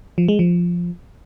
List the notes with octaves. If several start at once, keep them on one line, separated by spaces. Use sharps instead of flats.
F3
G#3
F3